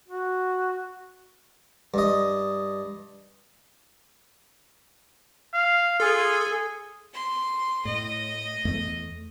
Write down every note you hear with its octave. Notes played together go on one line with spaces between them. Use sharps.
F#4
G2 D#5
F5
F4 G#4 A4
C6
A2 D#5
E2 A3